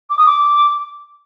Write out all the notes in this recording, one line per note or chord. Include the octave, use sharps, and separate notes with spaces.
D6
D#6
D6